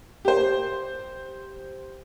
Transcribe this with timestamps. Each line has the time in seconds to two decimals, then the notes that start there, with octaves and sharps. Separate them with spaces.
0.25 G4 C5